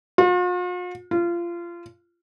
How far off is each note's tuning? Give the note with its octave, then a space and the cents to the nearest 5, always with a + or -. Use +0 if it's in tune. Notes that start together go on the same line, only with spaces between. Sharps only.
F4 +45
F4 -25